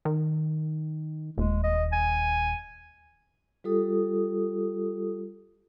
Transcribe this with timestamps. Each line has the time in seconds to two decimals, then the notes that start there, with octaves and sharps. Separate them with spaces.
0.05 D#3
1.38 D#1 G#3
1.64 D#5
1.92 G#5
3.64 G3 F4 G4 A4 D#6